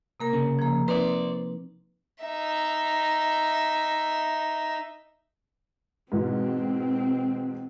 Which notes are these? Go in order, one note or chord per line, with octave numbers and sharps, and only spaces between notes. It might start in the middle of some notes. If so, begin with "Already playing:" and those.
C3 A#3 A#4
C#3
F3 A#3
C4 D#4 B4 C5 D5
D#4 E5
G#2 B2 E3 C4